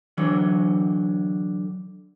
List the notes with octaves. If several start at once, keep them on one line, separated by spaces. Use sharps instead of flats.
D3 E3 F#3